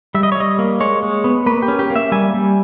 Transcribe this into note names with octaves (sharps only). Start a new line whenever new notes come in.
G3 E5
D#5
C#5
G3 D#5
A#3
G#3 C#5
G#3
B3
A#3 B4
G4
C#4
G4
A#3
E5
G3 G#5
G3